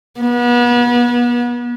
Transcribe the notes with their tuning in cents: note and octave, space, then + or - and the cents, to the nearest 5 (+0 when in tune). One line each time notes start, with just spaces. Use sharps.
B3 -35